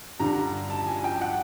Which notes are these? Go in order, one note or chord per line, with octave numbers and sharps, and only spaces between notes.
G2 D3 G3 A#5
A5
G#5
G5
F#5